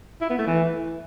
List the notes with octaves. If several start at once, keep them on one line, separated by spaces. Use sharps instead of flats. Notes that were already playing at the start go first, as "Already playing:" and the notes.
E4
B3
A3
E3